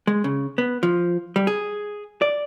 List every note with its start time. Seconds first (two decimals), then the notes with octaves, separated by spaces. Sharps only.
0.07 G#3
0.24 C#3
0.58 B3
0.83 F3
1.36 G3
1.47 G#4
2.22 D5